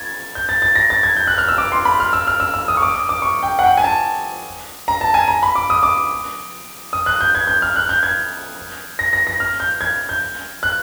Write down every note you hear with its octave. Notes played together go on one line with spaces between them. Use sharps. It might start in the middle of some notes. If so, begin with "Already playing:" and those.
Already playing: G#6 A6
G6
A6
A6
A#6
A6
G#6
G6
F#6
F6
E6
D6
C6
B5
F6
E6
F6
E6
E6
D#6
C#6
D6
D#6
D6
C#6
G5
F#5
G5
G#5
A5
A#5
A5
G#5
A#5
B5
D6
D#6
D6
D#6
F#6
G6
G#6
G6
F6
F#6
G6
G#6
A#6
A#6
A#6
F6
G6
G#6
G6
F#6